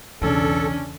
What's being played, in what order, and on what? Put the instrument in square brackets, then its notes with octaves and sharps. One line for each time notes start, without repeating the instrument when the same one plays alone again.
[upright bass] B1 E3 [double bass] E2 C#3 [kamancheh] C#4 D4 [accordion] A4